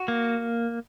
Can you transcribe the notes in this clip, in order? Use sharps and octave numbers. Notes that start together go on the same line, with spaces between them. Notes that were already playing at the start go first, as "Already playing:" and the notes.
Already playing: F#4
A#3